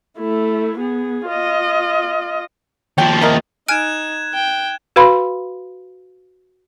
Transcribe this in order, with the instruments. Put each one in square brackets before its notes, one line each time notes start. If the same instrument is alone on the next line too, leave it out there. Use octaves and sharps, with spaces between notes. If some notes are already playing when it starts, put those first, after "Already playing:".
[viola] A3 E4
B3 G#4
F4 D#5
[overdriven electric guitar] D#2 F3 [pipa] C#5 G5
[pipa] E4 A#4 D#5
[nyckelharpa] D#4 [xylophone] G#5 F6 D7 [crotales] F#6 G#6 E7
[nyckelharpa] G5
[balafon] F#4 B4 F5 B5 C6